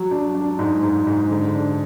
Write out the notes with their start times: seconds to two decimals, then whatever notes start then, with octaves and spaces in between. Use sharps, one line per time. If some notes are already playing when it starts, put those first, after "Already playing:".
Already playing: F#3
0.11 D4
0.35 D4
0.59 G#2
0.83 G#2
1.07 G#2
1.30 D3
1.54 D4